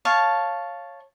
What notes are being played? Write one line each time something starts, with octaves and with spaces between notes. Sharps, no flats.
C#5 F5 A5